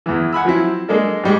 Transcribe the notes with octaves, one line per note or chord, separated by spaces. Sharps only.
E2 E3
F#5 G#5 B5 E6
F3 F#3 C4 E4
G#3 A#3 D4 A4
G#2 G3 G#3